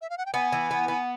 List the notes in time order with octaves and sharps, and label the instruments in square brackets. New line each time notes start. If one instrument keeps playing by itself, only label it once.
[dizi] E5
F5
F#5
G5
[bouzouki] B3 [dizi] G#5
[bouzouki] E3
B3
B3